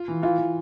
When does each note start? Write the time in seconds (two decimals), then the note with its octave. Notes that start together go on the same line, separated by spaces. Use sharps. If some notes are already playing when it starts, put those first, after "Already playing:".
Already playing: F4
0.08 E3
0.23 E3 F4
0.38 E3